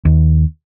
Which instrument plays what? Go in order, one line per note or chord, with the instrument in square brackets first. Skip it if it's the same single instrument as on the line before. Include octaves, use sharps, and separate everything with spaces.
[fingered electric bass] D#2